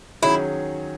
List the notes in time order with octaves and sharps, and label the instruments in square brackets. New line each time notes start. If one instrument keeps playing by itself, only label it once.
[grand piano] D#3 F#3 C#4 G#4 [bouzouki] E4